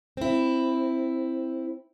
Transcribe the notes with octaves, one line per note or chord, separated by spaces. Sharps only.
C4 E4